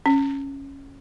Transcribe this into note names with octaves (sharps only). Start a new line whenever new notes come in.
C#4